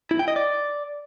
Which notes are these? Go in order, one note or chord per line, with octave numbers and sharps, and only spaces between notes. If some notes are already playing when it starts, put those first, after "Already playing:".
E4
G5
D#5
D5